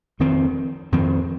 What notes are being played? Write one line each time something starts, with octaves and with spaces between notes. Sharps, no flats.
F2 D#3 C4
F2 D#3 C4